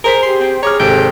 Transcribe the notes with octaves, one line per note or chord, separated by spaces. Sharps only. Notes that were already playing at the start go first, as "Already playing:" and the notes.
G#4 A#4 C5 B6
G4 C6
C4
G#4 C#5 A#5 D6 F6
G#1 C3 A4 G5